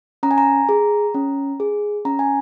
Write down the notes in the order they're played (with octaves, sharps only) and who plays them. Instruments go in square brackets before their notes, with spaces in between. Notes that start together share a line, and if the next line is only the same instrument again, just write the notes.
[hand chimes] C#4 A#5
G#5
A#5
G#4
C#4
G#4
C#4 A#5
G#5